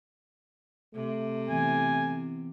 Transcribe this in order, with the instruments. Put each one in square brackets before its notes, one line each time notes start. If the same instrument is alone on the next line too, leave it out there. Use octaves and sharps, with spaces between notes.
[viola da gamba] C3 [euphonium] A3
[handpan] E3 B3 C4 [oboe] G#5